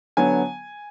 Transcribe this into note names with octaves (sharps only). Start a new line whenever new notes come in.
D3 F#3 B3 G#5